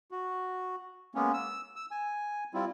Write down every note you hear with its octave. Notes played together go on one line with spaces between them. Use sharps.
F#4
G#3 A#3 B3 C#4
E6
E6
G#5
G3 C4 E4 F4